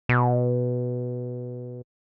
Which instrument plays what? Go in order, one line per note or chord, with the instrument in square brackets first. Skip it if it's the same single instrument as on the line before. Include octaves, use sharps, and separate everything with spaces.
[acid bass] B2